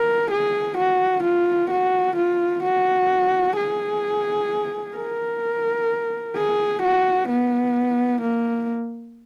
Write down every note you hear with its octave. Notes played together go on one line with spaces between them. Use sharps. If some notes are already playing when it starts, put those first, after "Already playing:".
Already playing: A#4
G#4
F#4
F4
F#4
F4
F#4
G#4
A#4
G#4
F#4
B3
A#3